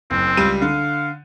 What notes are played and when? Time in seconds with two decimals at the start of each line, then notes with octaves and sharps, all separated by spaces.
0.11 F#1 C4
0.37 C#2 G3 D#7
0.62 D3 F5